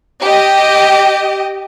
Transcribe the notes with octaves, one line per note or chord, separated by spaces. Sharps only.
G4 D#5